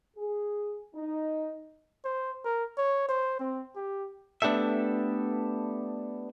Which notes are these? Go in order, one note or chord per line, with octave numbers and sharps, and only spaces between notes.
G#4
D#4
C5
A#4
C#5
C5
C4
G4
A3 B3 D4 G4 A4 E5